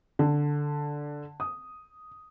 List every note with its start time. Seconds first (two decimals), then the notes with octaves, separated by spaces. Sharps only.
0.19 D3
1.40 D#6